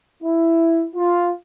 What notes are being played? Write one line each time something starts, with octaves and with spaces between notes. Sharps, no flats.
E4
F4